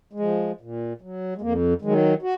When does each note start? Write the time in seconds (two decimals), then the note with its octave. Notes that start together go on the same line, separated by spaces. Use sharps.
0.13 G#3
0.20 F3
0.61 A#2
1.02 F#3
1.36 G#3
1.41 F2 A#3
1.82 D#3 F#3 G#3
2.22 F#4